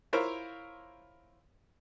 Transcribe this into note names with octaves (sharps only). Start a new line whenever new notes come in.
E4 F4 A#4 C5 C#5 F5